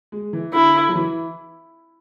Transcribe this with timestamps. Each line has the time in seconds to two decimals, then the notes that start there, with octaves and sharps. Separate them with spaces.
0.12 G#3
0.33 E3
0.54 D3 E4
0.89 F#3
0.95 E3